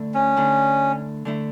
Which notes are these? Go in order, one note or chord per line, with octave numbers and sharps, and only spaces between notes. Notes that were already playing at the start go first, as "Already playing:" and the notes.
Already playing: D3 A3 E4
C#4
D3 A3 E4
D3 A3 E4